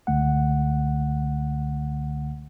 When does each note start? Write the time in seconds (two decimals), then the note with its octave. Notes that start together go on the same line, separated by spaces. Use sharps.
0.07 C#2 D3 A3 F#5